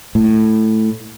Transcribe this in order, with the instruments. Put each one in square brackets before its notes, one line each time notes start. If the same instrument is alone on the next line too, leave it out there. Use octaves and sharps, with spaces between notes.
[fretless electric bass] A2